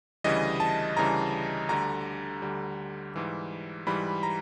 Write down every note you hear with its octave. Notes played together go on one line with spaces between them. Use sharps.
D2 C#3 E3 G3 D#5
A5
D2 C#3 E3 G3 A#5
D2 D3 G3 A#5
D2 D3 G3
G#2 E3 G3
G#2 E3 G3 B5
A#5